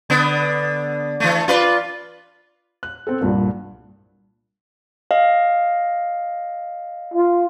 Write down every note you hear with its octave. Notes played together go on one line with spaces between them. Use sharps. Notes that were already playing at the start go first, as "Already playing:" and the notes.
D3 B3
E3 A3
F4 B4 D5
F#6
C4 A4
C2 G2 A#2
D#5 F5
F4